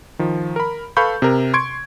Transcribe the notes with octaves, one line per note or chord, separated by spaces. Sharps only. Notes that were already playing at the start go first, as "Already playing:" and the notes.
D#3 F3
A#4 B5
A4 B4 F5 B5 C#6 G6
C3 A#4
C6 C#6 G#6 D7